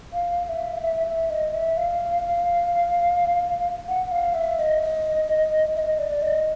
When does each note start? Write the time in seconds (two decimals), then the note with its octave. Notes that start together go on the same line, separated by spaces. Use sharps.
0.13 F5
0.44 F5
0.49 E5
0.76 F5
0.79 E5
1.07 E5
1.30 D#5
1.54 E5
1.77 F5
3.88 F#5
4.11 F5
4.35 E5
4.58 D#5
4.82 D#5
5.76 E5
5.79 D#5
5.99 D5
6.22 D#5